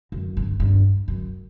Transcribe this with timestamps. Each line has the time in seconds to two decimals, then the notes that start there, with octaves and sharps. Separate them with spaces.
0.12 F#2
0.37 G2
0.60 G2
1.08 F#2